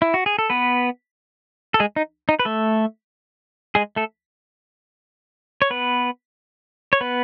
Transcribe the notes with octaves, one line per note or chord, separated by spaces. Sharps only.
E4
F#4
G#4
A4
B3 B4
A4
G#3 G#4
D#4
D#4
B4
A3 A4
G#3 G#4
A3 A4
C#5
B3 B4
C#5
B3 B4